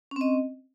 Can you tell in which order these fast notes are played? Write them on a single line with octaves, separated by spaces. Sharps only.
C#4 C4 D#5